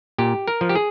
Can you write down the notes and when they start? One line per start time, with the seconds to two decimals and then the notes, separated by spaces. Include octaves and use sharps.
0.18 A#2 G4
0.48 A#4
0.61 F3
0.69 G4
0.75 G#4